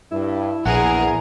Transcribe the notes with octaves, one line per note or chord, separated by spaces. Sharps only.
G2 E4
A#1 E2 G#4 A#4 F#5